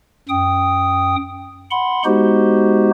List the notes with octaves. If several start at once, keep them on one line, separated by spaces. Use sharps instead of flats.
F#2 G5 D#6
F#5 B5 C6
G#3 B3 D#4 F#4 G4 C5